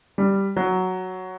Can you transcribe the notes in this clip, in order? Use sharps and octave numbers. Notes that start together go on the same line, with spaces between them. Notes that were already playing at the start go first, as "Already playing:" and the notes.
G3
F#3